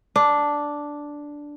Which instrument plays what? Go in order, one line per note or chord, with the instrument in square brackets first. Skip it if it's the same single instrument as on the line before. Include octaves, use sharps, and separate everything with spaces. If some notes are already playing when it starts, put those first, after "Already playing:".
[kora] D4